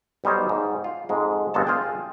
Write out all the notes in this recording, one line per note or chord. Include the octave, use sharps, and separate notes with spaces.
B1 G3 D#4 C5 C#5
G#2
F4
F2 G#2 G#3
G1 F2 A#2 G#3 A4 A5
F4 G#4 G5